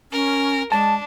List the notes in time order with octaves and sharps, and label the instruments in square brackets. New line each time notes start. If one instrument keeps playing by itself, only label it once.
[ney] C#4 [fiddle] A#4
[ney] G#3 [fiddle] D4 [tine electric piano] A5